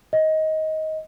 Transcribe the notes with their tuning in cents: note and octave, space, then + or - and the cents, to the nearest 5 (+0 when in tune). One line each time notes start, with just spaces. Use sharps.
D#5 +15